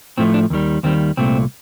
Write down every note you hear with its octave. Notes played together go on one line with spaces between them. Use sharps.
A2 F3 A3 C4
D4
D#2 D#3 G3
D#2 D#3 G3 C4
C2 A#2 A3 C4